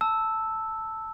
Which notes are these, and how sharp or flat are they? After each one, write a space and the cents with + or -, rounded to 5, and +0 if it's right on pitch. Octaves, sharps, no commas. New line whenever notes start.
A5 +10 E6 -5